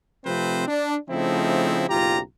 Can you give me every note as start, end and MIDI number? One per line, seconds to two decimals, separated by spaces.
0.25 0.65 48
0.25 0.65 53
0.25 0.65 57
0.25 0.65 60
0.25 0.65 71
0.25 0.65 72
0.67 0.95 62
1.09 1.84 49
1.09 1.84 53
1.09 1.84 57
1.09 1.84 60
1.09 1.84 63
1.09 1.84 64
1.89 2.19 30
1.89 2.19 35
1.89 2.19 65
1.89 2.19 67
1.89 2.19 82